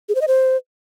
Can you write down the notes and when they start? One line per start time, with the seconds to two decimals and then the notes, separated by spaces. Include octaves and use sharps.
0.09 G#4
0.15 C5
0.21 D#5
0.28 C5